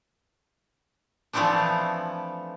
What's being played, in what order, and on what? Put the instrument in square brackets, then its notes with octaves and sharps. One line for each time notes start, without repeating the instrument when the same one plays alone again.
[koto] E3 F3 A3 B3 C4 D4